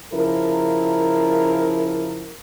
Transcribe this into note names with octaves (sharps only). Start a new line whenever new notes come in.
C#3 F3 E4 A#4